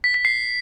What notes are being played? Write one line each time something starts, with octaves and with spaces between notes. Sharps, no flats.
B6
B6
C7